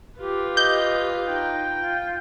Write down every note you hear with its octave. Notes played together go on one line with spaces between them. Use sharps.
F4 G4 B4
D#5 G6
D#4 G5
F4